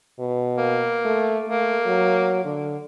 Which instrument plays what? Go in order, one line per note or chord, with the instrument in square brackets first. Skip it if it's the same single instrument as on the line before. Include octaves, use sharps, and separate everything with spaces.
[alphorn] B2
[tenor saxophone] A#3
[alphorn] A3
[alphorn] A3 [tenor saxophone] A#3
[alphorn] F#3
D3